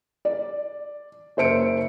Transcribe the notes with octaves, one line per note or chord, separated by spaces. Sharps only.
D5
F#1 C5 E5 C#7 D7